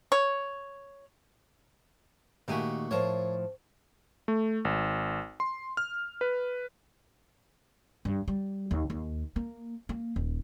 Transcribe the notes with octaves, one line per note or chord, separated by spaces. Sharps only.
C#5
A#2 D#3 A3 F#4 G4 G#5
A2 F3 A#4 C#5
A3
G#1
C6
F6
B4
G2
G3
D#2
D#2
A#3
A#3
D#1